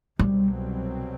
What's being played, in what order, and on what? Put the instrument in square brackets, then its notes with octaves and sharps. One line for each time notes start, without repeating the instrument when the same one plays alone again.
[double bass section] C2 B2 F#3 C4 [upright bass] G3